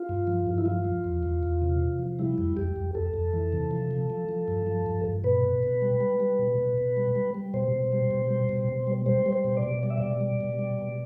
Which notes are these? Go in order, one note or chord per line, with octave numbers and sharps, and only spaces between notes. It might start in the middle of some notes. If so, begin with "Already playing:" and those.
Already playing: F4
G2
F3
G2
E4
F3 F4
F3
E2
E2
E2
C3
C3
F3
G3 E4
F2
F2 G4
F2
F2 A4
F2
E3
C3
F3
F3
F3
F3
G2
F3
G2
G2
B2 B4
B2
B2
G3
G3
G3
B2
B2
B2
G3
G3
G3
B2 C5
B2
G3
B2
G3
B2
B2
G3
G3 C5
G3
C5
B2
D5
B2
G3 D5
E5
B2 D5
G3
B2
G3
B2